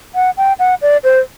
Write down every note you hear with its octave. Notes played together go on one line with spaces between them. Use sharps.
F#5
G5
F#5
D5
C5